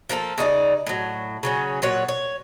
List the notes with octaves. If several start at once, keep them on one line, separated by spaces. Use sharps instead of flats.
F3 A#3 D4 A4
C#3 D#4 F4 D5
A2 F#3
C#3 F#3 C#4
A#2 F#3 C#5 F#5
C#5